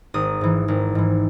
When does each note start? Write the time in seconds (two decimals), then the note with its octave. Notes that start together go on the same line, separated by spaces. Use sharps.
0.14 G#1 D#6
0.41 G#2 E3
0.68 G#1
0.95 G#2 E3